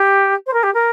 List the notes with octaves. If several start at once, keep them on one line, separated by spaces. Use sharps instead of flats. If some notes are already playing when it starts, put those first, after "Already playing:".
Already playing: G4
C5
A#4
G4
A#4